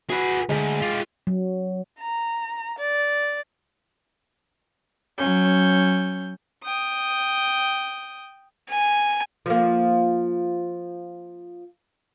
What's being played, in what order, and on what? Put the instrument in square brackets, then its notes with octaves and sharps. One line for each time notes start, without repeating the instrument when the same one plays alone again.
[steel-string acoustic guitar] F#4 [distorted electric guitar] G#4 B4
[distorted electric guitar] D2 [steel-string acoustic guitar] G#3
[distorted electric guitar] F4 G4
[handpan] F#3
[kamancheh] A#5
D5
[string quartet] F#3 C#4 G6
[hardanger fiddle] G5 D#6
G#5
[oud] F3 A#3